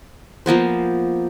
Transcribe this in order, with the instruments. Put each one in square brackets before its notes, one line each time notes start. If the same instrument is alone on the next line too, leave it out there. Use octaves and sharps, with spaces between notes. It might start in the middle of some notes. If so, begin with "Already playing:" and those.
[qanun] F3 A#3 B3 C5